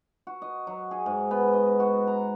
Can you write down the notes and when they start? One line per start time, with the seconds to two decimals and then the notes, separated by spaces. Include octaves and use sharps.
0.27 F#4
0.42 D#5
0.67 F#3
0.91 G#4
1.06 G#2
1.31 B3
1.54 D#5
1.80 F#4
2.07 A#5